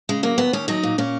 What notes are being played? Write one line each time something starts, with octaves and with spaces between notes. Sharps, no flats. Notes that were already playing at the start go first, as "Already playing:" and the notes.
C#3 G#3
F#3 A#3
D#2 B3
D#2 C#4
F#3 D#4
A#2
A#2 C#4